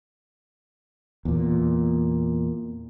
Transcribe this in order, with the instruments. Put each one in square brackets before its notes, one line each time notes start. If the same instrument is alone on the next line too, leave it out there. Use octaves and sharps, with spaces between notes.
[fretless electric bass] E2 A#2